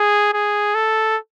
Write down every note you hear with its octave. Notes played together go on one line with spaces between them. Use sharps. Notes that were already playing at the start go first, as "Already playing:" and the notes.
Already playing: G#4
G#4
A4